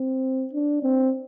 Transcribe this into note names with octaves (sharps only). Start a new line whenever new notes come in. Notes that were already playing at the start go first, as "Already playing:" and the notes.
Already playing: C4
D4
C4